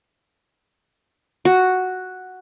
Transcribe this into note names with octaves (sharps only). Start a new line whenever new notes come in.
F#4